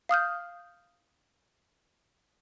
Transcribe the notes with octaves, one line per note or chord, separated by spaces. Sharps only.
F5 D#6 F6 G6